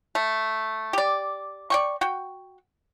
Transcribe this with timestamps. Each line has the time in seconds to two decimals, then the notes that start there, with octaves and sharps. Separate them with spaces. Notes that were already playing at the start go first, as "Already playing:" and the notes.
0.15 A3
0.93 G4 D5
1.70 D5 G5 C#6
2.01 F#4 G5